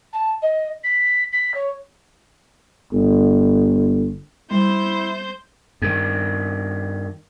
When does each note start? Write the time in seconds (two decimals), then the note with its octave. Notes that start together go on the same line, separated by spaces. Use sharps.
0.13 A5
0.42 D#5
0.84 B6
1.32 B6
1.54 C#5
2.92 G1
4.51 G3 E4 C5 G6
5.82 G2 D#3